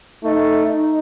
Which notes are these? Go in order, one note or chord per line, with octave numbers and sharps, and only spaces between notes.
A3 D#4
D#4